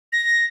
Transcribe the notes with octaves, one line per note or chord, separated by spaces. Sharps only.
A#6